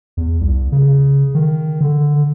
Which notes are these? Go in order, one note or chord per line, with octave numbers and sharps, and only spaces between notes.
E2
C2
C#3
D#3
D3